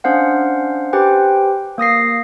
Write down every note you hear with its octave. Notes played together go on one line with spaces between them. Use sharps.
C#4 D4 C5 F5 F#5
G4 B4 C5 G5 G#5
A#3 D#6 A#6 C7